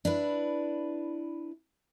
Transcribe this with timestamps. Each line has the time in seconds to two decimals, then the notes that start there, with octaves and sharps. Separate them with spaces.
0.05 D4 E4 B4